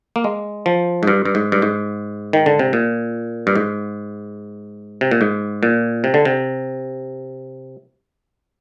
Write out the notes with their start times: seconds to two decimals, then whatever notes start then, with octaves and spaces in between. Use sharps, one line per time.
0.16 A#3
0.24 G#3
0.66 F3
1.03 G#2
1.07 G2
1.25 G2
1.35 G#2
1.52 G2
1.62 G#2
2.33 D#3
2.46 D3
2.59 C3
2.73 A#2
3.47 G2
3.55 G#2
5.01 C3
5.11 A#2
5.21 G#2
5.63 A#2
6.04 C3
6.14 D3
6.25 C3